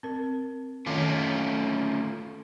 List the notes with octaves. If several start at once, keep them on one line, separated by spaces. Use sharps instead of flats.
C4 A#4
D#3 A3 C#4 F4